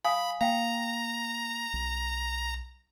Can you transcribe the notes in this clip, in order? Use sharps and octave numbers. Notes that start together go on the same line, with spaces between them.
F5 G#5 B5 D#6
A#3 F5 G5 A#5
B1